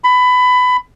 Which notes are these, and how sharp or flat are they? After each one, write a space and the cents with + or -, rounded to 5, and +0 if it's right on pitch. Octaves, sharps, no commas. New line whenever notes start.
B5 +20